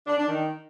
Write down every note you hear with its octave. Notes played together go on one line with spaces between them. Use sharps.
D4
D4
D#3